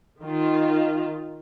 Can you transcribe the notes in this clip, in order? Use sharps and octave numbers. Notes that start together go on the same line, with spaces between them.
D#3 F4